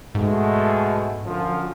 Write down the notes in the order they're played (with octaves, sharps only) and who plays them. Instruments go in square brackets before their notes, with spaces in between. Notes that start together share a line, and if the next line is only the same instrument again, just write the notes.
[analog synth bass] G#2 [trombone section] B2 G#3 A3
[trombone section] F#2 D3 F3